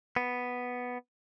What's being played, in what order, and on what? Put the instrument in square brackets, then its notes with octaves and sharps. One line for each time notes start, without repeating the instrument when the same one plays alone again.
[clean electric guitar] B3